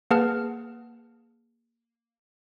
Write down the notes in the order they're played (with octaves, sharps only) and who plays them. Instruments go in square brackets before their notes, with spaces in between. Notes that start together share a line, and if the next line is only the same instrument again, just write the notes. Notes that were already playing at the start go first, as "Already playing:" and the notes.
[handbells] A#3 G#4 B4 F#5 A5 F6